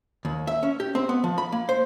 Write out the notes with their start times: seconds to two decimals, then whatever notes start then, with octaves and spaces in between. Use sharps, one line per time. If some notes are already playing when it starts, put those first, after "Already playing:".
0.25 D#2
0.47 E5
0.63 C#4
0.80 G4
0.95 C4
1.09 B3
1.24 F3
1.38 B5
1.52 A#3
1.69 C5